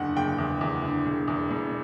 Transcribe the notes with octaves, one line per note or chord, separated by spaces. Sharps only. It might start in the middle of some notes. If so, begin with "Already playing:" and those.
Already playing: F#1 E2 D3 F#5
F#1 G5
E2
E2
D3
E1
E2
E1